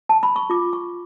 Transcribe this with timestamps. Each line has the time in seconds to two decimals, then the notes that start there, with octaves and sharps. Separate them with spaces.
0.09 A5
0.23 B5
0.36 C#6
0.50 F4 D6
0.73 C#6